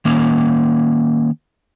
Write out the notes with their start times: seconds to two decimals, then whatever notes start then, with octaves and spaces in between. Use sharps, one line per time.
0.05 D#3 A#3 C#4